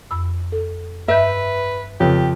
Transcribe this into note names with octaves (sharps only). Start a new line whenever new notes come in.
F2 B5 E6
A4
G2 B4 D#5 E5 G6
F2 C#3 G4 B4 C#5